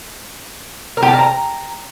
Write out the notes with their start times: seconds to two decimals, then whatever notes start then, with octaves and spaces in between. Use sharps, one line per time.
0.97 A#4
1.03 G4
1.08 A5
1.13 A#4
1.19 A#5